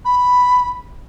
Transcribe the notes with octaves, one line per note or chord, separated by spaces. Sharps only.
B5